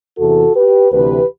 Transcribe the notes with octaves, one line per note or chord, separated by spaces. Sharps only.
E2 C3 E3 F#4 A4
G4 B4
D2 C3 E3 G4 B4